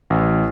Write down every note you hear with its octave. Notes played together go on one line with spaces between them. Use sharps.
A1